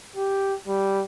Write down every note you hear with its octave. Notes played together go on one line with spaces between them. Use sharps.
G4
G3